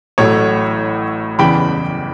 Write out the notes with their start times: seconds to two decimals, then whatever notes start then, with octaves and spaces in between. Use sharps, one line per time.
0.18 A1 A2 F#3 A3 C#5
1.39 F#1 E2 C#3 E3 G3 G5 B5